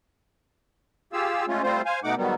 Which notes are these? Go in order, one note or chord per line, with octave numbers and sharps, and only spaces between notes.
F4 G4 G#4 F5 E6
G#3 A3 C#4 F4
G3 A3 C4 F4 C5
C5 F5 G#5
B2 A3 D#4 F#5 D6
G#2 D#3 F#3 G3 B3